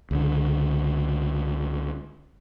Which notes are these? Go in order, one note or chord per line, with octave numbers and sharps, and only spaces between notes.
C#2 D3